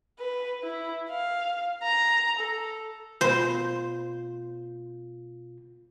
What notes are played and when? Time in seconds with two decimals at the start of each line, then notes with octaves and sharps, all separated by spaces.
0.19 B4
0.64 E4
1.10 F5
1.83 A#5
2.39 A4
3.21 B2 F4 C5